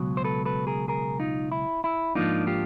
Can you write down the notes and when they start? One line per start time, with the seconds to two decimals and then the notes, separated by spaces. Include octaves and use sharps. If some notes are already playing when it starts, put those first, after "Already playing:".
Already playing: C#2 B2 F#3
0.17 C5
0.25 A4 B4
0.45 A4 B4
0.67 G#4 A#4
0.88 G#4 A#4
1.20 D#4 F4
1.52 E4
1.84 E4
2.15 G#2 F3 A#3 D4 D#4 F4
2.47 F4 G4